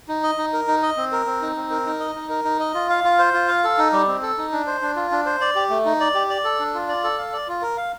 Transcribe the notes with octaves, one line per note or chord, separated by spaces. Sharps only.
D#4
D#5
D#4
A#4
D#4
D#5
C4
A#4
C4
D#4
C4
A#4
D#4
D#5
D#4
A#4
D#4
D#5
F4
F5
F4
C5
F4
F5
A4
D#4
G3
C4
A4
D#4
D4
C5
D4
F4
D4
C5
D5
G4
A3
D#4
D5
G4
D5
A4
D4
F4
D5
A4
F5
D5
F4
A#4
F5